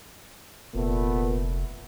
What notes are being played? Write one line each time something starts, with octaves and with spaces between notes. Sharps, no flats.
F1 A#2 A3 B3